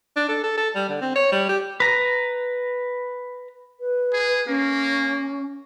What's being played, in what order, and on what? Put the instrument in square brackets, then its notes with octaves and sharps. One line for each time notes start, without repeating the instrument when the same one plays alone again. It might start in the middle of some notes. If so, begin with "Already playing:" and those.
[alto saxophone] D4
A4
A4
A4
G3
D3
C4
C#5
G3
G4
[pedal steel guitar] B4 A#5
[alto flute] B4
[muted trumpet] G#4
[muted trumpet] A#3 [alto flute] C#4